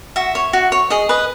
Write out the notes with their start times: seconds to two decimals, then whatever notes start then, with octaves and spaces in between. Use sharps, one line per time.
0.16 F#4 E5
0.35 C#5
0.53 F#4
0.72 C#5
0.90 G#4 D#5
1.09 B4 D#5